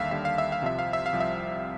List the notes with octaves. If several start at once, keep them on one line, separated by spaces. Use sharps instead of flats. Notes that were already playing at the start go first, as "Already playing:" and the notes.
Already playing: D#2 D3 G3 E5 F5
D#2 D3 G3 E5
F5
E5
F5
C2 C3 F3 E5
F5
E5
F5
C2 C3 F3
E5